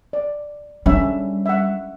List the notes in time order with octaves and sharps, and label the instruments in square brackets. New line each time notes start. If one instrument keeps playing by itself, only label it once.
[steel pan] D5
[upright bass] G3 [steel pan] C#4 D4 E5
[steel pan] E5 F#5